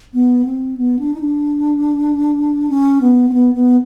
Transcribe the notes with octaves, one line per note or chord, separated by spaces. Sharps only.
B3
C4
B3
D4
D#4
D4
C#4
B3
C4
B3
B3